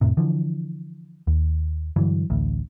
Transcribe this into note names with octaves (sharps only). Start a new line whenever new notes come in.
F2 A2 C3
D3 E3 F3
D#2
G2 D3 E3 F#3
A1 D2